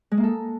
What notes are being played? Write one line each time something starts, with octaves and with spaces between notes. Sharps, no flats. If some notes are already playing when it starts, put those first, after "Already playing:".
G#3
A#3
A4